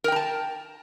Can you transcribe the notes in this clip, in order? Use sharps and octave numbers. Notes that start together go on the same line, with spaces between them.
A#4 G5 A5 A#5